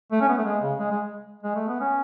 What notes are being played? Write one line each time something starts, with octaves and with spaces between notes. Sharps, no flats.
A3
C#4
B3
A3
G#3
C#3
G#3
G#3
G#3
A3
B3
C#4